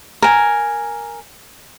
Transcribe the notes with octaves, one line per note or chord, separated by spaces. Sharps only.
A#4 G#5